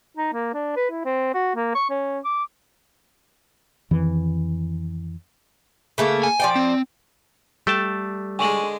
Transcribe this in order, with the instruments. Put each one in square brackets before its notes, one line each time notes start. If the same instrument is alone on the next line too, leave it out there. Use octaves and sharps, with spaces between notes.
[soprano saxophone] D#4
A#3
D4
B4
E4
C4
F#4
A#3
C#6
C#4
D6
[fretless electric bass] F2 D#3 E3
[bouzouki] C#3 A3 A#3
[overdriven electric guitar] G#5
[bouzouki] F3 D5 G5
[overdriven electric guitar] C4
[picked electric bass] G3 [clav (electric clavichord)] A3 G5 A5
[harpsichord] D3 G#3 [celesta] G#5 C#6 F#7